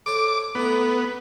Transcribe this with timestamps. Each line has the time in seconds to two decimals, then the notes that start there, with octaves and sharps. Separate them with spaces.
0.06 A4 C5 C#5 D6
0.55 A2 B3 A#5